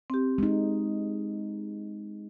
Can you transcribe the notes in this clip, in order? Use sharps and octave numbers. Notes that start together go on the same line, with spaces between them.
C4 G4
G#3 D#4